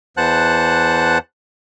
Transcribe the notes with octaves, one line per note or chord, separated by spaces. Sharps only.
E2 E3 C5 F#5 A5 F#6